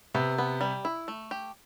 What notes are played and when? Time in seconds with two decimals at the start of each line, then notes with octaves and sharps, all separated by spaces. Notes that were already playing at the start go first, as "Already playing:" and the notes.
0.14 C3 B3
0.38 B3
0.61 G3
0.85 E4
1.08 A3
1.31 G4